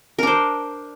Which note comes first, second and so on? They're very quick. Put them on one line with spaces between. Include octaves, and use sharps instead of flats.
A#4 D4 C5